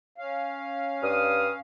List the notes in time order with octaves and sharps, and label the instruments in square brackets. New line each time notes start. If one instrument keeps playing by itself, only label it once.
[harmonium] C#4 F5
[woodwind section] G2 D#6 F6